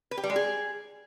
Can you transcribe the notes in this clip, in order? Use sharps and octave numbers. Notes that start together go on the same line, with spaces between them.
B4
G4
G3
G#3
G#4